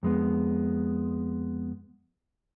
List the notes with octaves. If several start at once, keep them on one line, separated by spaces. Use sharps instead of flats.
F2 G#3 B3